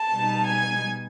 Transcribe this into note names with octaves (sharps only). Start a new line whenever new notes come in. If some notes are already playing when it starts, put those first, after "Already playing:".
Already playing: A5
B2 G3 B3 D#4
G#5